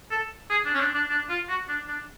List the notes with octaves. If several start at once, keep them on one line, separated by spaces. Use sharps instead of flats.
A4
G#4
D4
C#4
D4
D4
D4
F4
F#4
D4
D4